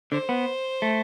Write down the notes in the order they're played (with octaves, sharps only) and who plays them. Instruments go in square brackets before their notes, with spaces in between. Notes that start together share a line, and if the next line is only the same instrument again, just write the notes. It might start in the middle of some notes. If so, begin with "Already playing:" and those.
[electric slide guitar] D3 [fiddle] C5
[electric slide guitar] B3
A3